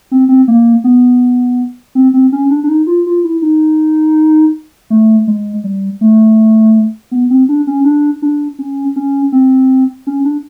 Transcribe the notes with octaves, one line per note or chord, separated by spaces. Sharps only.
C4
C4
A#3
B3
C4
C4
C#4
D4
D4
D#4
F4
F4
E4
D#4
A3
G#3
G3
A3
B3
C4
D4
C#4
D4
D4
C#4
C#4
C4
C#4
D4